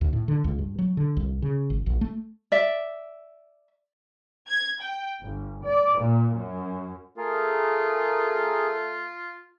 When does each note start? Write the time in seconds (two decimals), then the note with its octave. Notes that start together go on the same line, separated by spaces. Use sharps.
0.01 D2
0.13 A2
0.28 D3
0.44 C#2
0.59 G2
0.79 F#3
0.97 D3
1.17 C2
1.42 C#3
1.70 G#1
1.86 A#1
2.01 A3
2.52 D5 E5
4.48 G#6
4.82 G5
5.22 G1
5.64 D5
6.00 A#2
6.33 F#2
7.18 A3 F4 G#4 A#4